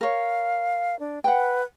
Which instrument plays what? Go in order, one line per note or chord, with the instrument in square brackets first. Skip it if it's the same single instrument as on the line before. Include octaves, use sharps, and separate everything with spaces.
[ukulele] A#4 C#5 [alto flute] F5
[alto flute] D4
[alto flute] B4 [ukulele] F#5 G5